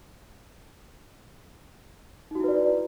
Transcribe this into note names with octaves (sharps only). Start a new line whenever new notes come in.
D#4 E4 F#4 B4 D5